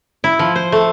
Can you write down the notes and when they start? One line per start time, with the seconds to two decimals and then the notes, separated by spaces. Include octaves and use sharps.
0.24 E4
0.39 F3
0.56 C5
0.72 A3